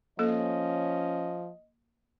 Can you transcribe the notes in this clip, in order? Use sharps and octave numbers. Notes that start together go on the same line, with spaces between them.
F3 A#3 C#4 A4 D#5